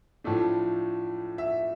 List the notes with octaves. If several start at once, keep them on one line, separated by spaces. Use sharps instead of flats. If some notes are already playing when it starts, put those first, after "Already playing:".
A2 F3 A3 D4
E5